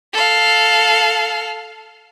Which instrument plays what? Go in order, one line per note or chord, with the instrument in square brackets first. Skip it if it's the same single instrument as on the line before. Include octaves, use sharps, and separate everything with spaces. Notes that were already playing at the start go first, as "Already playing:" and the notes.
[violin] A4 F5